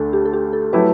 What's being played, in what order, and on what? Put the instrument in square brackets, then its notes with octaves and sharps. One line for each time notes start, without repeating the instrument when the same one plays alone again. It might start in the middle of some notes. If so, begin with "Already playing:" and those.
Already playing: [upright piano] D2 D3 A3 [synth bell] A4
[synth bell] G4
A4
G4
A4
[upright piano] F#3 A3 E4 G4 [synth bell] B4